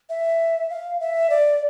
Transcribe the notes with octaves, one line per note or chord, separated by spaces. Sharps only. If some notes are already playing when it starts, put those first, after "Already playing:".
E5
F5
E5
D5